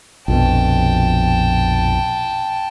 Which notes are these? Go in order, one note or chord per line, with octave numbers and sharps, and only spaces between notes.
A#1 F2 B2 G5 A5